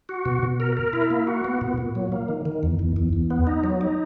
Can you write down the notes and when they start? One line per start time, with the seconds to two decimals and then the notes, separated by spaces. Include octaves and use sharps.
0.09 F#4
0.26 B2
0.43 B2
0.60 A#4
0.77 A#4
0.93 E4
1.10 A#3
1.27 F#4
1.44 B3
1.61 A#2
1.78 A#2
1.95 F#3
2.12 A#3
2.28 D#3
2.45 D#3
2.63 E2
2.79 E2
2.96 E2
3.13 E2
3.30 B3
3.47 D#4
3.64 F#3
3.81 D#4